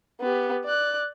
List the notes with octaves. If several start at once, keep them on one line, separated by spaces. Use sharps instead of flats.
B3 G4
D5 F#6